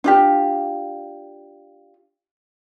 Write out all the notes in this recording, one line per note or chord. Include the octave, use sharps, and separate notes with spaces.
D4 F4 G4